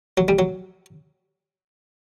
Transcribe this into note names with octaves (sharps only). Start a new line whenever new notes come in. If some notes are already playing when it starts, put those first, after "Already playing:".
F#3
G3
F#3